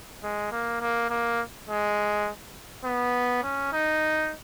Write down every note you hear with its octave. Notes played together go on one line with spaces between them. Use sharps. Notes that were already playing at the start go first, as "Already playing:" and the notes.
G#3
A#3
A#3
A#3
G#3
B3
C#4
D#4